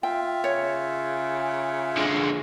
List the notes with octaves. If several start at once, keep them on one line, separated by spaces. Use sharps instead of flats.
F4 E5 G5
C#3 C#5
D3 G#3